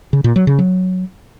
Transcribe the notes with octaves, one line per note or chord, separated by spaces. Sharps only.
C#3
A#2
F#3
C#3
F#3